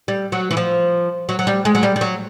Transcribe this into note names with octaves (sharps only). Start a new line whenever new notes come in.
G3
F#3
E3
F3
F#3
F#3
G3
G#3
F#3
G3
G3
F#3